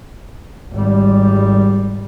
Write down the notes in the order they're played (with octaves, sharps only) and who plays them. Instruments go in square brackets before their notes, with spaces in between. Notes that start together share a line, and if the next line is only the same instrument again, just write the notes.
[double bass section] G#1 G3